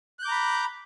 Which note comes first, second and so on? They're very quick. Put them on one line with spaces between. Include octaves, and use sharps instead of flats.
F#6 G6 D6 A#5 B5